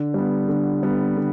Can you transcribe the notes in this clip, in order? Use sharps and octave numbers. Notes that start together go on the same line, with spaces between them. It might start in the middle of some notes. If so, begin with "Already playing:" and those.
Already playing: D3
G3 B3
D3
G3 B3
D3